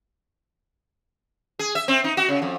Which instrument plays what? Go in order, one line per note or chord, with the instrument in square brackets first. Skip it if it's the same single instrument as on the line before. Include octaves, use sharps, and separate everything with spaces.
[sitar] G#4
E5
C4
D#4
F#4
C#3
F2